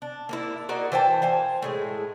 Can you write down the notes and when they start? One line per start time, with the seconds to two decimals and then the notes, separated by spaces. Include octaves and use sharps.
0.02 D4
0.29 A#3 D4 E4
0.69 A#3 F#4 D5 D#5
0.92 E3 C5 G5 A5
1.22 C5 F5 G#5
1.62 A2 G#3 G#4